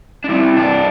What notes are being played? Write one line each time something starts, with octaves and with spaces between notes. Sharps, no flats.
D4
C3 G3 C4 E4
D4